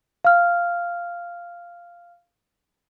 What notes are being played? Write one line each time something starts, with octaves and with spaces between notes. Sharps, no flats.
F5 F6